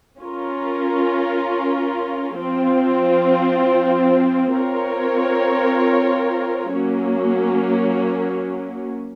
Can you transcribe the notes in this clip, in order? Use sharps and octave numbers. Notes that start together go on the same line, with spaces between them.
C#4 F4 A#4
F3 C4 F4
C4 F4 A#4 C#5
F#3 A#3 C#4